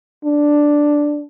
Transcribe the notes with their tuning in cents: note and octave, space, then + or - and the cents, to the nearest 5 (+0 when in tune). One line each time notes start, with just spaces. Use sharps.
D4 +0